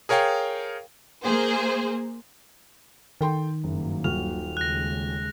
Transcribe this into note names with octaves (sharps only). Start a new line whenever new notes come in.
G#4 A#4 C#5 F5 G5
A#3 G#4 C5
D#3 A4 G5 C6
F#1 G2 F#3 A#3
D#1 F#4 F6 F7
D#2 C#3 G#3 F#6 A#6